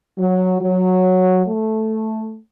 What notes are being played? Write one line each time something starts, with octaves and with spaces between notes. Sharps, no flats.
F#3
F#3
A3